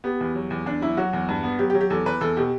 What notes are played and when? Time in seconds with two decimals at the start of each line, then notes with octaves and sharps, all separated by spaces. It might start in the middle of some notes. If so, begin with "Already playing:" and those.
0.04 B3 G4
0.20 E2
0.35 F#3
0.51 E2
0.66 E2 D4
0.81 F#3 E4
0.97 F#3 F#4
1.13 E2
1.29 G2
1.43 B3
1.59 F#3 G4
1.70 G4
1.74 F#3
1.81 G4
1.90 E2 A4
2.06 E2 B4
2.21 E2 A4
2.37 B2 G4